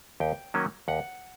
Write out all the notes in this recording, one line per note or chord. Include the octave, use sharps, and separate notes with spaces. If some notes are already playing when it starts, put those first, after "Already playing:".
D#2 G5
D#3 F#3 A#3 C#4
D#2 F#5